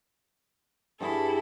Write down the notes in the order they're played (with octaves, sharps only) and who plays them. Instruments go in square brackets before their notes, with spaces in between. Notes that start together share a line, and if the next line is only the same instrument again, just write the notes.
[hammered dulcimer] G2 G#4 [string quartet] E4 A4